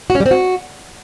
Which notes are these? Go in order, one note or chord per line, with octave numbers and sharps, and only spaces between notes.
F#4
C#4
G3
C4
F#4